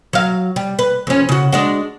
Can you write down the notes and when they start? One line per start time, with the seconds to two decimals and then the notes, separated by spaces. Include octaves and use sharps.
0.13 F#3 F5
0.56 G3
0.79 B4
1.07 F2 C#4
1.29 C#3 F#4
1.53 G#3 D4 F#4